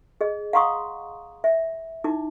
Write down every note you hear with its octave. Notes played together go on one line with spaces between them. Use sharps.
G#4 D#5
F5 F#5 A#5 C6 C#6 D#6
E5
D#4 E4 D6